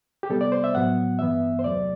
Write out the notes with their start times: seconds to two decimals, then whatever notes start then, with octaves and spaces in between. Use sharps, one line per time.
0.23 G4
0.30 C3 G3 B3 A4
0.41 D5
0.52 C5
0.64 E5
0.75 A2 F#3 B3 F#5
1.19 G2 E3 B3 E5
1.59 C5
1.63 E2 C3 F#3 A3 D5